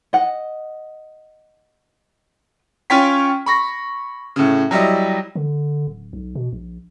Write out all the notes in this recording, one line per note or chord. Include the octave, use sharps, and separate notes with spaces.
D#5 F#5
C#4 F4 C#5 G5 B6
B5 C#6 A#6
A2 C#3
F#3 G3 E4 D#5
D3
D1
B1
B2
A#1